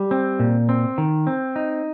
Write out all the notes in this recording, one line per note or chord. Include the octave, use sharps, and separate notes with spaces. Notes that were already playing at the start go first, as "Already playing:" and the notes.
Already playing: G3
C4
A#2
C4
D#3
C4
D#4